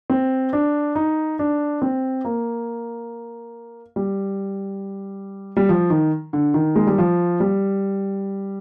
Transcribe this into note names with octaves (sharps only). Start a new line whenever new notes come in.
C4
D4
D#4
D4
C4
A#3
G3
G3
F3
D#3
D3
D#3
G#3
G3
F3
G3